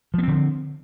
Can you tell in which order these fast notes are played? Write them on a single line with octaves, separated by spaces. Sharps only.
F3 B3 C4 D3